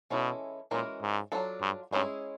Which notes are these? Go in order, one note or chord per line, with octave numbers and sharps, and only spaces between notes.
B2 E3 G#3 C#4 E4 A4
A#2 E3 G#3 C#4 F#4 A#4
G#2
F#3 B3 D4 F4 A4
G2
G2 G#3 C#4 E4 G#4